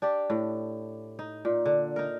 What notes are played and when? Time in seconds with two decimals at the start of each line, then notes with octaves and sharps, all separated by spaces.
0.02 D4 G4 D5
0.30 A2
1.19 D#4
1.45 A#2
1.66 D3
1.96 D#4 A#4